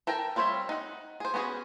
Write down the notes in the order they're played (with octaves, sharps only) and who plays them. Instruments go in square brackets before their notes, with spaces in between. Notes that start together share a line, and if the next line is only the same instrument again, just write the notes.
[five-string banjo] A4 A#4 G5 A5 A#5
G3 C4 F4 C#5 E5
D#4 F#5
G#4 C5
B3 C#4 F#4 G#4